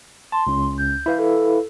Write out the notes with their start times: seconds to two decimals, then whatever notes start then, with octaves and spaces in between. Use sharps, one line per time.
0.32 A5 C6
0.47 C#2 C#4
0.78 G6
1.06 E4 B4 F5
1.19 A4